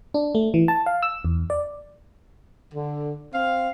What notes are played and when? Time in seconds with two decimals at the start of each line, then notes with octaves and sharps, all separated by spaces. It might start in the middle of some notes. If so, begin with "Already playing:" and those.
0.14 D4
0.35 A3
0.54 E3
0.68 A5
0.86 F5
1.03 E6
1.25 E2
1.50 D5
2.74 D3
3.33 C4 F5